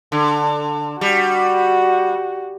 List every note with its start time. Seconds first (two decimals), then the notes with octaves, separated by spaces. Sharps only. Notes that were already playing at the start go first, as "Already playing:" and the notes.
0.12 D3
1.01 G3 F#4